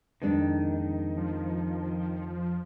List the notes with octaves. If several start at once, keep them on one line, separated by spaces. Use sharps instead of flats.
F2 D#3 G#3 D4
F3